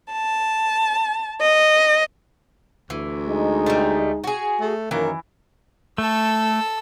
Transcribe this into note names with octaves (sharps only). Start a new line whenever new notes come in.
A5
D#5
D2 E3
G#3 D#4
G3 A3
F#4 G#4
A3
F#2 D#3 E3 A#3
A3 A4 E6